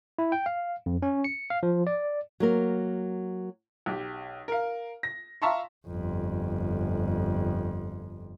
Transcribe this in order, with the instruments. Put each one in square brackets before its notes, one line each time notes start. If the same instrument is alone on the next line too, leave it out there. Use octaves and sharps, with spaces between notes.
[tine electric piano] E4
G5
F5
F2
C#4
C#7
F5
F3
D5
[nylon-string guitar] F#3 A#3 A#4
[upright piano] B1 G4
A#4 F5
A#6
E5 F5 A5 A#5 C6 C#6
[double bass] G1 F2